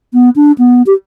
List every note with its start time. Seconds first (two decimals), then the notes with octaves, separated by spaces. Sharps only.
0.14 B3
0.36 D4
0.58 B3
0.87 G4